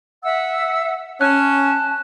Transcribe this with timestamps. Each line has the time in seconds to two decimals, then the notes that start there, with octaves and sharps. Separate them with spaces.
0.23 E5 F#5 E6
1.21 C#4 A5 F#6